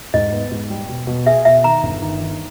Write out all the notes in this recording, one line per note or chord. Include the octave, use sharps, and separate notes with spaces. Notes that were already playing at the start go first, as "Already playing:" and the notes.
G#2 D#5
B3
G#2
G3
B2
B2
G#4 E5
B2 E5
D#3 A#5
G1
D#3
D#3